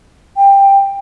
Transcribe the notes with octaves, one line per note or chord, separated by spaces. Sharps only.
G5